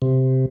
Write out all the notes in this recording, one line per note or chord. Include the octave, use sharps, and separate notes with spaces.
C3